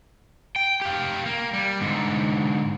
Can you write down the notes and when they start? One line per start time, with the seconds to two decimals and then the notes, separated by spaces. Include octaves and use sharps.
0.56 G5
0.81 G4 F5
1.26 A#3
1.53 G3
1.81 G#2 D3